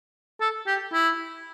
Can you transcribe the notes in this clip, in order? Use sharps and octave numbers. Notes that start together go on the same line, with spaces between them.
A4
G4
E4